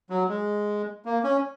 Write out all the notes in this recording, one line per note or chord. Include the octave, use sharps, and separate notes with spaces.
F#3
G#3
A#3
C#4